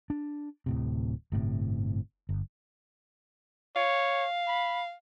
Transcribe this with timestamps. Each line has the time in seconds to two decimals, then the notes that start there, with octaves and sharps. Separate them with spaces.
0.10 D4
0.66 D1 A2 C3
1.32 G1 A2 C3
2.29 G1
3.76 C#5 F5
4.47 B5